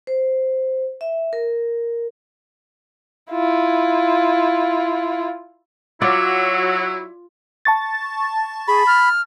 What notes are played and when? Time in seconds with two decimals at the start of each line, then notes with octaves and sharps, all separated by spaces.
0.07 C5
1.01 E5
1.33 A#4
3.32 E4 F4
6.02 F#3 E4 F4 D5
7.65 A5 C#6 A6
8.68 G#4 B5
8.87 F6